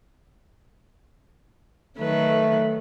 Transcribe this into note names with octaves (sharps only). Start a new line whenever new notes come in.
D#3 F#3 A3 B4